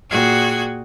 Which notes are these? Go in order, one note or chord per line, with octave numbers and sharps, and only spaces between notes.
A#2 F#4 G#4 G5 G#6